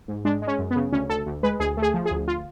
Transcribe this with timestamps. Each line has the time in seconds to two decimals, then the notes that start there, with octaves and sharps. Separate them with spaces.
0.08 G#2
0.25 G#3 D4
0.42 G#3
0.47 C#4
0.59 F#2
0.71 B3
0.76 C#3
0.92 D2 C#4
1.09 D2 A4
1.26 D2
1.43 G#3 B4
1.60 D2 G#4
1.77 A3
1.82 G#4
1.94 F3
2.06 G#4
2.11 D2
2.28 F4